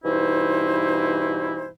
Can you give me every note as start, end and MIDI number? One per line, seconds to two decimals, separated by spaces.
0.04 1.69 43
0.04 1.69 47
0.04 1.69 52
0.04 1.69 63
0.04 1.69 64
0.04 1.69 72